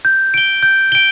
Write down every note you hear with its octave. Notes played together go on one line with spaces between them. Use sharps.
G6
D7 G7
G6
D7 G7